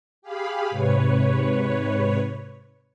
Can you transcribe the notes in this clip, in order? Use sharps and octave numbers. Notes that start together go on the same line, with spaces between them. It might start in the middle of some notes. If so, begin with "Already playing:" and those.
G4 G#4 F5 B5
G#2 C3 B4 C#5